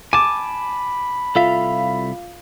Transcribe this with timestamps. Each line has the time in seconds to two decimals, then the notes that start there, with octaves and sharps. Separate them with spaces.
0.13 G#5 A5 B5 D6
1.35 C2 F4 A4 E5 F5